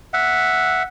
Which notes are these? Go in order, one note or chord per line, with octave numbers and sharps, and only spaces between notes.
E5 F#5